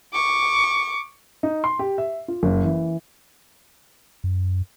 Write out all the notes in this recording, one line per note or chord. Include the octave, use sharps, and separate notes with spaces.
C#6 D6
D#4
C6
G4
E5
F4
F#1
E3
F#2